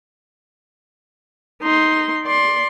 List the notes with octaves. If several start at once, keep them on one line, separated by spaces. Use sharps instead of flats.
D#4 C6
D5 C6